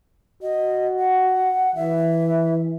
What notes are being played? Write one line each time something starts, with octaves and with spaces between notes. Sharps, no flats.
F#4 D#5
F#5
E3 E5